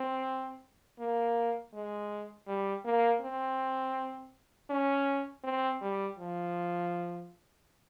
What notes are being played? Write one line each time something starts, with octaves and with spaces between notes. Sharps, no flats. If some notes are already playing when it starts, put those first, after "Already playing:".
Already playing: C4
A#3
G#3
G3
A#3
C4
C#4
C4
G3
F3